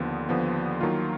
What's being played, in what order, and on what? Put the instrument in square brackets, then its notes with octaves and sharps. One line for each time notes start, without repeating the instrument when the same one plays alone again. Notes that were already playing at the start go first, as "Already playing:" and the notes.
Already playing: [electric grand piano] D#2 D3 F3 B3
D#2 D3 F3 B3
D#3 F#3 A#3 F4